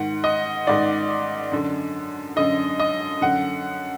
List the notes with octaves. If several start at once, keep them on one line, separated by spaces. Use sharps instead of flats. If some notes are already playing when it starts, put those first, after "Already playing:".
Already playing: G#2 D#3 F#5
D#5
G#2 D#3 D5
F#2 D3
F#2 D3 D#5
D#5
F#2 D3 F#5